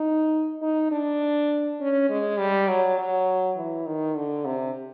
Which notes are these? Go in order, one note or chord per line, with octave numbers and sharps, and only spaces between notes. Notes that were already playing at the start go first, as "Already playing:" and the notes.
Already playing: D#4
D#4
D4
C#4
G#3
G3
F#3
F#3
E3
D#3
D3
C3